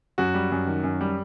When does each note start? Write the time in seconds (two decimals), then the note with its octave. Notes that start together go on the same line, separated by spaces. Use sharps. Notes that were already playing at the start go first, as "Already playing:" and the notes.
0.18 F#2 F#4
0.34 G3
0.51 F#2
0.67 D#3
0.83 F#2
1.01 G3